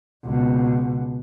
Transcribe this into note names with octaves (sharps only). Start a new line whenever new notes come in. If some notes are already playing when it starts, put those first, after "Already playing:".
C#2 B2